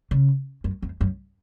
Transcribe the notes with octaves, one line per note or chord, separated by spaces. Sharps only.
C#3
F#2
F2
F#2